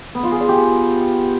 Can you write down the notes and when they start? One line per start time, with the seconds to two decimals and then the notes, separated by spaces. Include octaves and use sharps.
0.15 B3
0.23 F4
0.32 G#4
0.40 D5
0.49 G4